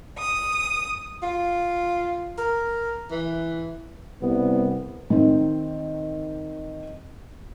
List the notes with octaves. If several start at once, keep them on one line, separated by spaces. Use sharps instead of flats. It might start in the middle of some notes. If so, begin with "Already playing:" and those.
D#6
F4
A#4
E3
C2 B3
D#3 C4